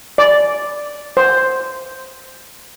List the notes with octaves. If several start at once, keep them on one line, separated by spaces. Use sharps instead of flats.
D5
C5